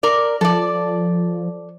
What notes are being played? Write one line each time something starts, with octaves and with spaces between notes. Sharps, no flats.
A#4 D5
F3 A4 D5